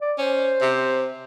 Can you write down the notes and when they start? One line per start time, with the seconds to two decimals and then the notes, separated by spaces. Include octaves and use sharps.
0.01 D5
0.18 C#4 C5
0.61 C3